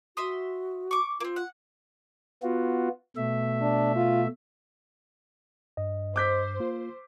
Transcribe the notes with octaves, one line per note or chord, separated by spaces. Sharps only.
F#4 E5 C6 D#6
C#6 D6
A#3 C4 F4
F#5
B3 F4 F#4
B2 A3 E5
D4
F4
G2 D#5
C5 D6 G6 B6
A#3 F4